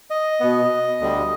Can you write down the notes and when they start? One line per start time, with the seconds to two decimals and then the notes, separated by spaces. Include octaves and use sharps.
0.10 D#5
0.40 B2 B3
1.00 D2 D3 G3